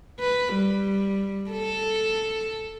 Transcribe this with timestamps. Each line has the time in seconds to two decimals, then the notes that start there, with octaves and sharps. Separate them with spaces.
0.20 B4
0.55 G3
1.51 A4